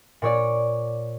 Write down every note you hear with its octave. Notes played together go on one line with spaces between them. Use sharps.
A#2 C#5 D5